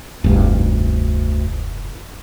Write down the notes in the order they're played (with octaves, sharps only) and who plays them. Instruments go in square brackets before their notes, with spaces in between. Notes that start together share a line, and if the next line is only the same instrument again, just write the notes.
[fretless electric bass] F1 G2 [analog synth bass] D2